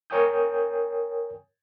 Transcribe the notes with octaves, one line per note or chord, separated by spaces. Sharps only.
A#4 C#5 G5 G#5 D#6 G6